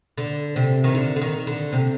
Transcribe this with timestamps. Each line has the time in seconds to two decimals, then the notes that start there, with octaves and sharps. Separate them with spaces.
0.18 D3
0.56 C3
0.84 D#3
0.95 D3
1.16 D3
1.22 D#3
1.47 D3
1.73 C3